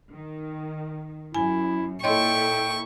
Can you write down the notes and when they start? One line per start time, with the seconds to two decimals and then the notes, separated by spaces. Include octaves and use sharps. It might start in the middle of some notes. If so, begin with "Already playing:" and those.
0.12 D#3
1.35 F#2 E4 G#5
2.04 A#2 E4 A4 C#5 D#5 G5 C6 C#6